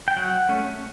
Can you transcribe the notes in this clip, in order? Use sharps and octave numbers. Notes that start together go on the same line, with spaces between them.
G5
F#3 F#5
A3 C#4